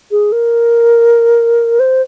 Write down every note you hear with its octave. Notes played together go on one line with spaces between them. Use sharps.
G#4
A#4
C5